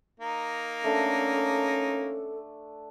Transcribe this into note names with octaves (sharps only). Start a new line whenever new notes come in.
A#3 D#4
A3 C#4 D4 A4 F#5